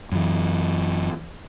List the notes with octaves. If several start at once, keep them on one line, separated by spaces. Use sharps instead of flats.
F#2 E3